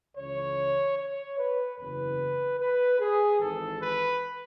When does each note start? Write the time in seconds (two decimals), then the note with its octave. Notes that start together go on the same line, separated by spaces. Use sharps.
0.17 C#2 C#3 E3 C#5
0.98 C#5
1.39 B4
1.78 F#1 E2 C#3 B4
2.60 B4
3.00 G#4
3.41 G#1 G#2 E3 A4
3.81 B4